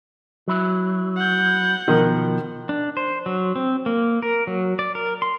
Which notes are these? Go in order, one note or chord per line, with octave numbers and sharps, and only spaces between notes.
F#3 E4
F#5 G6
B2 D#3 F3
D4
C5
F#3
C4
A#3
A#4
F#3
D5
A#4
C6